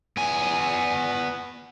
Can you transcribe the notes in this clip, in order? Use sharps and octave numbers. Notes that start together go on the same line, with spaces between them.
B3 G#5